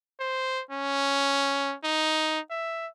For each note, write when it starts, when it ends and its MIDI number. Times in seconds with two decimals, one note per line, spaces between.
0.20 0.62 72
0.71 1.75 61
1.84 2.40 63
2.50 2.87 76